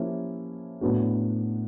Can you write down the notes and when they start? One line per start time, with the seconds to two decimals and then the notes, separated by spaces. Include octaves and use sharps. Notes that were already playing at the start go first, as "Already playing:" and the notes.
Already playing: F3 A#3 C#4 E4 G4
0.81 A2 F#3 B3 D4 F#4